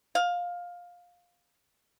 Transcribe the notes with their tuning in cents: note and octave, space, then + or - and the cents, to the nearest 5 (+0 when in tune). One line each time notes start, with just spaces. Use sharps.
F5 +15